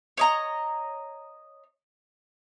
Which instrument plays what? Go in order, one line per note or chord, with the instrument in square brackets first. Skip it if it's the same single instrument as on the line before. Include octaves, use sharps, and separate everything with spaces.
[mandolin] C#5 D#5 A#5